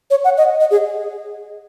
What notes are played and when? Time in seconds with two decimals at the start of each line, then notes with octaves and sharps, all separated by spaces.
0.11 C#5
0.24 F#5
0.38 D#5
0.60 D#5
0.71 G#4